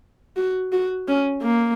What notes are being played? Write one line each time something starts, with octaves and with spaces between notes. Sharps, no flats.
F#4
F#4
C#4
A#3